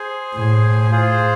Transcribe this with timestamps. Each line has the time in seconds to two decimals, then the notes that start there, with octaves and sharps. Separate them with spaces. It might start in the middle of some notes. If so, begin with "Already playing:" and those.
Already playing: G#4 C5 G#5
0.36 A2 G#4 C5 G#5
0.91 F4 G#4 C5